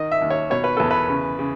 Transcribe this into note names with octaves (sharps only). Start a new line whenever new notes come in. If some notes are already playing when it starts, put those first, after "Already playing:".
Already playing: D#3 D#5
E5
D#2
C#5
B2 C#5
B4
E2 A4
B4
C#3
C#3